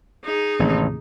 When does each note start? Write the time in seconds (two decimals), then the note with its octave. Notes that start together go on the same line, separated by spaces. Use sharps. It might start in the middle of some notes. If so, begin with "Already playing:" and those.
0.24 D#4 G#4
0.59 A1 D#2 A2 C3